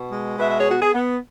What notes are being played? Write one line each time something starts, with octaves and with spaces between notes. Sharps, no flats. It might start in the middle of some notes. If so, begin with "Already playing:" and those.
Already playing: B2
G#3
B2 B4 E5
E5
G#4 C#5
B3 F#4
G#4
B3